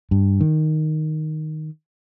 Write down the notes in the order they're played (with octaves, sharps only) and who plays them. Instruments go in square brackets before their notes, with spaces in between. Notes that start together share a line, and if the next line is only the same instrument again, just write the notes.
[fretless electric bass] G2
D#3